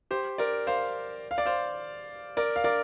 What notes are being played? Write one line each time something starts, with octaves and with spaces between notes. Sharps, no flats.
G4 C5
A#4 D5
C5 F5
F5
D5
C5 F5
A#4 D5
F5
A#4 D5